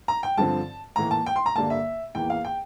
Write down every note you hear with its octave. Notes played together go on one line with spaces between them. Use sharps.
A#5
G5
G2 D3 F3 C4 A5
A2 E3 A#3 A#5
A5
G5
C6
A#5
G2 D3 G3 A#3 A5
E5
E2 E3 A#3 G5
F5
G5